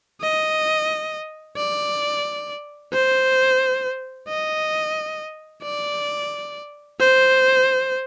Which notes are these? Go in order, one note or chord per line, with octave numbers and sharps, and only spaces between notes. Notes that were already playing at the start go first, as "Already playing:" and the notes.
D#5
D5
C5
D#5
D5
C5